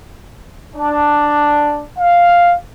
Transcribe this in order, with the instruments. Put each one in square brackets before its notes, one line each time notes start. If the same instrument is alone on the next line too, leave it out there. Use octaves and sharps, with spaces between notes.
[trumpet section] D4
F5